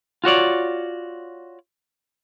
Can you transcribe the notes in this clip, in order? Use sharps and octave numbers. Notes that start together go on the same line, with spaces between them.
F4 F#4 C#5 D5